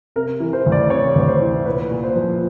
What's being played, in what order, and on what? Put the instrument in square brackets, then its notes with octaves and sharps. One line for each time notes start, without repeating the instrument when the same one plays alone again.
[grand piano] C3 A#4
E3
C5
D2
D5
C3 C#5
D2 C#5
C5
E3
A#2 B4
A#2
C5
F3